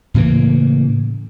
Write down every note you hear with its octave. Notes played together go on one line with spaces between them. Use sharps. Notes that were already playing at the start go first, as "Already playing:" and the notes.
A2 C#3 E3 A#3